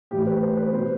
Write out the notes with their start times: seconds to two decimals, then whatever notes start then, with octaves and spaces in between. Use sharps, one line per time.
0.11 A2 E3 G3 G4
0.27 B4
0.42 C5
0.57 B4
0.73 B2 G3 C4 C5